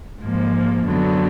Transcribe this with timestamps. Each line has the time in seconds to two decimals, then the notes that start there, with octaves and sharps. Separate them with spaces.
0.21 G#2 F3 A#3
0.86 F#2 D3 F#3 B3